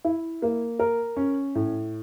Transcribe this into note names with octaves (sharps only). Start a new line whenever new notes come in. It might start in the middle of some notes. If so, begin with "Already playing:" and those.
E4
A#3
A#4
C#4
A2